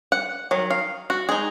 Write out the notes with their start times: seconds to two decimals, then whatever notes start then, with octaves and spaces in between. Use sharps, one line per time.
0.12 F#5
0.51 D#3 F#3
0.71 F5
1.10 F#4
1.29 G#3 D#4 G#4